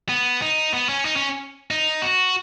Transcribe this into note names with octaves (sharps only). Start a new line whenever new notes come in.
B3
D#4
B3
C#4
D#4
C#4
D#4
F#4